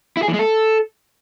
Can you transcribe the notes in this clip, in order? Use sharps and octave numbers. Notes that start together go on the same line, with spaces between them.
E4
G#4
E3
G#3
A4